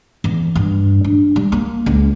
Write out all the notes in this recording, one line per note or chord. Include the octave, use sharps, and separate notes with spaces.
E2
G2
D4
G3
A#3
C#2